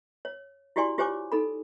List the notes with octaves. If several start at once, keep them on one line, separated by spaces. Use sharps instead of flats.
C#5
E4 F#4 G4 D5 G#5 C6
F4 G4 C5 C#5 G#5 D6
D#4 A4 B5